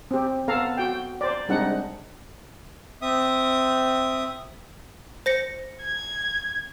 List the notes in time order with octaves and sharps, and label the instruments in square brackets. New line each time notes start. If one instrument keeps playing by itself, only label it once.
[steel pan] C4 G4
B3 A4 F5 A#5
F#4 G5
C5 D5
G3 G#3 C4 D4 D#4 F#5
[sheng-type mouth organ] C4 E5 D#6
[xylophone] C5 A#6 C#7
[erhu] G#6